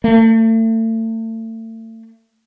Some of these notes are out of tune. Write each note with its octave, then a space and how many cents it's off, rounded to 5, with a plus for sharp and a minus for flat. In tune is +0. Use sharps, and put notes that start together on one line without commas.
A3 +35